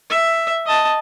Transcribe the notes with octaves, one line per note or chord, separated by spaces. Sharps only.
E5
D#5 A5